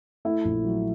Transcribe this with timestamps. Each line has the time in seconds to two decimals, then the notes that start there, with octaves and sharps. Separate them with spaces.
0.25 A3 E4 E5
0.45 A#1
0.65 F#3